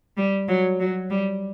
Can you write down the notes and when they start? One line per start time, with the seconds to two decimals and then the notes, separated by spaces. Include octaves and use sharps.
0.17 G3
0.48 F#3
0.80 F#3
1.10 G3